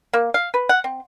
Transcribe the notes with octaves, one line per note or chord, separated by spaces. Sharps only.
A#3
F5
B4
F#5
C4